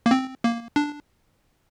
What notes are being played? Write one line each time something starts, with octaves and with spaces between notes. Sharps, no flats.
A#3
C4
A#3
D4